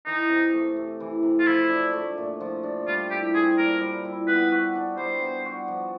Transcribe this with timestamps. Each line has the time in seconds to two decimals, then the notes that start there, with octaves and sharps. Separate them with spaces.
0.06 E3 D#4
0.30 C3
0.54 A3
0.76 C3
1.00 E3
1.23 C3
1.39 F4
1.47 F3 E4
1.70 D4
1.93 A3
2.18 A#2
2.40 F3
2.63 D4
2.87 G3 F4
3.11 E4 G4
3.34 C4 G#4
3.58 A#2 A#4
3.81 G3
4.05 E4
4.28 B3 B4
4.52 F#4
4.75 D4
4.97 G3 C5
5.22 B3
5.45 F#4
5.68 F3